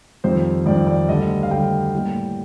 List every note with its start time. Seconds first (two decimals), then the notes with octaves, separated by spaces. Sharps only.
0.24 F2 D#3 G3 C4 C5
0.66 F2 D#3 G3 C4 D5
0.87 D5
1.09 D2 D3 G3 D#5
1.43 F5
1.51 D2 D3 G3 G5
1.94 A2 G3 A#3